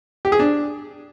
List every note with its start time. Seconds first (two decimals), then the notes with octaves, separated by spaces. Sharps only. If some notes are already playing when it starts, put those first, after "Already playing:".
0.25 G4
0.32 G#4
0.39 D4